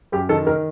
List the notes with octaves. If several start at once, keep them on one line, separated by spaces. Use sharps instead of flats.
F#2 G4
D#3 A4
D#3 A#4